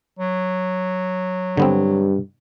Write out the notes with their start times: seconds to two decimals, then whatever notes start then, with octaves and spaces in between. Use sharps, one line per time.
0.19 F#3
1.57 G2 D3 B3 C4